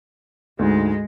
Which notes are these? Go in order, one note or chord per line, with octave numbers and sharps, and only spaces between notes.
D2 G#2 G#3